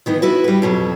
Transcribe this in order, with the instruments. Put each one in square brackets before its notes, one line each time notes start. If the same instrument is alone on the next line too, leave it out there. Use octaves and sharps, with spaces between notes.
[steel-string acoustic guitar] D#3 E3 B3
E4 F#4 B4
G3 B4
F2 B2 F#3